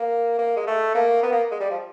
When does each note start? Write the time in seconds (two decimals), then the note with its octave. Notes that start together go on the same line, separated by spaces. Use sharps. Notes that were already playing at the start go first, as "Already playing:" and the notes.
Already playing: A#3
0.38 A#3
0.56 G#3
0.67 A3
0.95 A#3
1.23 B3
1.32 A#3
1.51 G#3
1.60 G3
1.70 F3